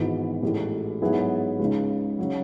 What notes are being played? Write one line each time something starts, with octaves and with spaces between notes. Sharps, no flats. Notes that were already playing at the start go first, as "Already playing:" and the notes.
Already playing: G#1 G#2 E3 B3
A1 A2 E3 G#3
G#2 F#3 B3 E4 G#4
C#2 C#3 G#3 D#4
C#3 F#3